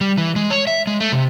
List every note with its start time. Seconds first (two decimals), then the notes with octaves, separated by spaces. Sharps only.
0.01 G3
0.18 E3
0.36 G#3
0.50 C#5
0.67 E5
0.87 G#3
1.00 A3
1.12 C3